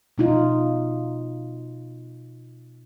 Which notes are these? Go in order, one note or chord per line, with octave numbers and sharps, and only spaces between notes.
B2 D#4 F4